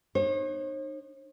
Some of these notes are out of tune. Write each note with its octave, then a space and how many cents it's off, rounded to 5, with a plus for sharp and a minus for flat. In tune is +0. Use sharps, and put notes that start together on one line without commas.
D#4 -35 C#5 -45